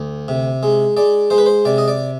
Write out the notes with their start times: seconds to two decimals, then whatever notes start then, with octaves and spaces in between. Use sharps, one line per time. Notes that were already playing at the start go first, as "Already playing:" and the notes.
Already playing: D2
0.28 C3
0.63 G#3
0.97 G#3 D5
1.30 G#3 C5
1.38 B4
1.46 C5
1.65 C3 D5
1.78 D#5
1.88 D5